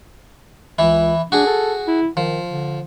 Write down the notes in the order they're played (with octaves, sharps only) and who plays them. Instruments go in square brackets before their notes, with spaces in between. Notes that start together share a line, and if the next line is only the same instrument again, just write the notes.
[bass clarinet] C#2 [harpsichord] E3 E4
[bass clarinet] D4 [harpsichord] F#4 G#4
[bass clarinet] A4
E4
[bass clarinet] D#3 [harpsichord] F3
[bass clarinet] D3